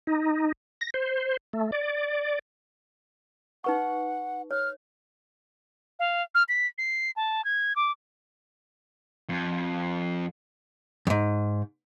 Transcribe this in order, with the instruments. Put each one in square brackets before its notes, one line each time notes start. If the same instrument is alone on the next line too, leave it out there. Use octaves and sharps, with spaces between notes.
[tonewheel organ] D#4
A#6
C5
A3
D5
[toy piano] D#4 B4 C#6 [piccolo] F#5
[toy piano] C#5 [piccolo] F6
[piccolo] F5
F6
B6
C7
A5
G#6
D6
[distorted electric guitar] F2
[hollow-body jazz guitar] F2 G#2